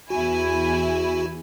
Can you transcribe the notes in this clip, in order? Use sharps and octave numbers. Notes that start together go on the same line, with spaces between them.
E2 E4 F#4 G#5